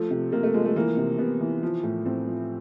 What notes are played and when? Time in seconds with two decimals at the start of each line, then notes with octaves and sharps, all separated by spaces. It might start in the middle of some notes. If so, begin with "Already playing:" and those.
Already playing: F3 A3
0.11 C3
0.32 C3 A#3
0.43 A3
0.54 F3 G#3
0.65 A3
0.76 E3 A#3
0.97 C3
1.18 C3 B3
1.41 E3
1.63 F3
1.83 A2
2.05 A2 C4
2.27 F3